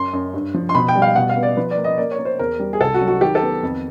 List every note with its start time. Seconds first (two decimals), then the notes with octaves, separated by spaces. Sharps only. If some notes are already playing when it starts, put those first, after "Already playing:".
Already playing: F#2 C6
0.13 F#2
0.34 G2
0.54 F3
0.69 C6
0.75 B2 B5
0.89 G5
0.96 G3
1.02 F5
1.16 B2 F#5
1.29 F5
1.37 B3
1.43 D5
1.57 F3 B4
1.71 D5
1.78 A#3
1.84 D#5
1.98 A#3 D5
2.12 C#5
2.19 A#3
2.25 C5
2.39 E2 A#4
2.60 G3
2.73 G#4
2.80 C2 A4
2.94 F#4
3.01 F#3
3.08 F#4
3.21 D#3 G4
3.35 A4
3.42 B3
3.63 F2